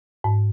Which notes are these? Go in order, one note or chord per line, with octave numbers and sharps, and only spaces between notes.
G#2